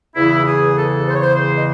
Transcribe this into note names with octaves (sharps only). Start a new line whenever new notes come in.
E2 C#3 E3 E4
G#4
A4
C5
C#5
C5
C5
D#5